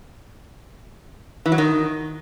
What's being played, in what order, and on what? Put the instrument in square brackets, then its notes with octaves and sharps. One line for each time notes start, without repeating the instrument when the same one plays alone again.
[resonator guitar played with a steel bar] E3
F#3
D#3